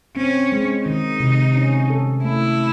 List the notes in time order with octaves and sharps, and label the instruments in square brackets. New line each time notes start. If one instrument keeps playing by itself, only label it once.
[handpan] C4 [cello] C#4
[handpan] G#3
[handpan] D#3 [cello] D#4
[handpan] C3
C#4
A4
[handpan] A3 [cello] E4